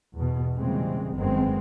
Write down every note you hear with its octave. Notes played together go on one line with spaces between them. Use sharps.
E2 B2
A#2 C#3 E3 G3 G#3 C4
G1 F#2 D#3 G#3 B3 C4